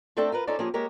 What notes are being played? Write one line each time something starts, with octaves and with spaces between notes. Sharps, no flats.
A3 C4 D4 A4 E5 G5
F4 A#4 B4
C#4 D#4 F4 A4 C5 D5
F3 A#3 C#4 G4 G#4
G#3 A#3 G4 A#4 C#5